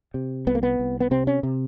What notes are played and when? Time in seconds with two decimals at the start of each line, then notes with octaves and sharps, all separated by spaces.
0.14 C3
0.47 C2 B3
0.55 A#3
0.63 B3
0.80 C2
1.00 B3
1.11 C3 C4
1.27 C#4
1.43 C3